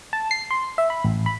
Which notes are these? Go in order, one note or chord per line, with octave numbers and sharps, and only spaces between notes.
A5
C7
C6
E5
B5
A1
B5